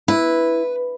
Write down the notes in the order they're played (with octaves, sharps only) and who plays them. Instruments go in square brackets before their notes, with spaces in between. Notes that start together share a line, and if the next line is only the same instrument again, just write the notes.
[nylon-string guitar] E4 [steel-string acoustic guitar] B4